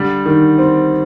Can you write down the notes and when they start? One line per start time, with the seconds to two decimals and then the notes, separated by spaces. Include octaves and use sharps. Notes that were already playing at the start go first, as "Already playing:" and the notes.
Already playing: D3 G3
0.26 D#3
0.58 C4